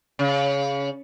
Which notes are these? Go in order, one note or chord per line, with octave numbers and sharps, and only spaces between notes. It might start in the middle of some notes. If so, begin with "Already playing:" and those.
C#3